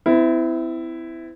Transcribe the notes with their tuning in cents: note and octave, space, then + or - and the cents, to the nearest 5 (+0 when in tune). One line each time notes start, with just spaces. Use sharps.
C4 -40 E4 +0